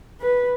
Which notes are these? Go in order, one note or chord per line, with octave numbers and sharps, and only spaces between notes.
B4